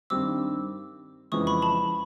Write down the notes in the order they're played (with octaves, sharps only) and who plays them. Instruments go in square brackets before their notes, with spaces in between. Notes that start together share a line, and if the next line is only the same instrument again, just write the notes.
[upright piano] G2 D#3 G3 C4 [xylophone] D6 E6
[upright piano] F2 C#3 E3 G#3 [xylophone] C#6 D#6
[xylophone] B5 C#6
A5 B5